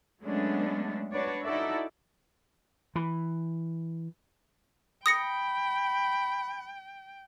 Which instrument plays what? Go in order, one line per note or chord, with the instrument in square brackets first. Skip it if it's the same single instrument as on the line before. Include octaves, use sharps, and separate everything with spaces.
[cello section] F#3 G#3 A3 B3 C#4 D4
D4 F#4 B4 C#5 D5
D#4 E4 F#4 A4 D5 E5
[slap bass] E3
[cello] G5 [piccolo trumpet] B5 [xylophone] D#6 A#6 C#7